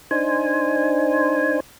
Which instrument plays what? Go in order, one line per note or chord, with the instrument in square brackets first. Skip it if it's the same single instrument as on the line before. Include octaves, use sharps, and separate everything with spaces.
[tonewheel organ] D4 D#4 C5 G#5